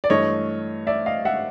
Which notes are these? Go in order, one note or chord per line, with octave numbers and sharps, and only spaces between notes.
D5
G2 E3 A3 C#5 D#5
D5 E5
D#5 F5
E5 F#5